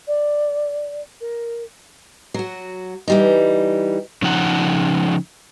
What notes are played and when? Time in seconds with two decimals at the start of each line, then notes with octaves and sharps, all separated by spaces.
0.07 D5
1.21 A#4
2.34 F#3 F#4
3.08 E3 G3 D#4
4.22 C#3 F3 D#4 F#5